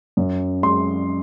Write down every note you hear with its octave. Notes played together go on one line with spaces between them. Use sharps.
F#2
G#3 C6